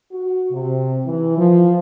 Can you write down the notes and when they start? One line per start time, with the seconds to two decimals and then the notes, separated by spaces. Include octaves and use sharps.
0.13 F#4
0.52 C3
1.06 E3
1.38 F3